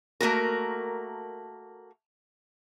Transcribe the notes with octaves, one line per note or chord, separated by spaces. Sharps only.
A3 A#3 F#4 A#4